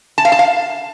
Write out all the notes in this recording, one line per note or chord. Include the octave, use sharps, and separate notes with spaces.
A5
F5
A5
F5